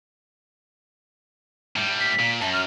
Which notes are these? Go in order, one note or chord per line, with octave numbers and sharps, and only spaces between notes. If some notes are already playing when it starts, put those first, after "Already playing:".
A2 G3
B6
A#2
F#2 A5
F6